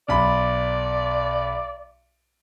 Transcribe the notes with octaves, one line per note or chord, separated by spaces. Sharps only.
B1 D5 B5